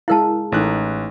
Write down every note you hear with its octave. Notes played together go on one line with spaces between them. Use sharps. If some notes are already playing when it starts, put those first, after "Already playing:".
G#3 E4 A#4 F5 A5
A1 A3 D#4 F#6